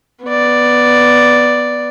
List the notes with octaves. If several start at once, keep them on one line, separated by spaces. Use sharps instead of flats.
B3 D5